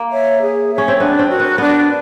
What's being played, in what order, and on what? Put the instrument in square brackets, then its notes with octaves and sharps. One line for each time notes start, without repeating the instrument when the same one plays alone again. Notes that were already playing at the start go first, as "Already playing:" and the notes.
Already playing: [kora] A#3
[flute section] C#5 E5
G#4
C#5 E5
[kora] C#4
C4
[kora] B3 [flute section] D4
[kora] C4
[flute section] F#4 A#4
[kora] B3
[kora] B3 [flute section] D4